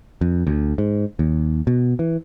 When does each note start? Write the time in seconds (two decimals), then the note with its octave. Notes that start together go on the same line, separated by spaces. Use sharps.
0.21 F2
0.47 D2
0.78 G#2
1.19 D#2
1.67 B2
1.99 E3